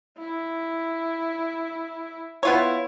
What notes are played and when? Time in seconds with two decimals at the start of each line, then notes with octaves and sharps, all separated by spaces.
0.18 E4
2.43 B3 E4 F4 C#5